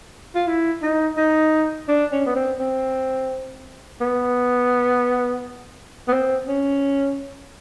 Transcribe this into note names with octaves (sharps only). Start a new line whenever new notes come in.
F4
E4
D#4
D#4
D4
C#4
B3
C4
C4
B3
B3
C4
C#4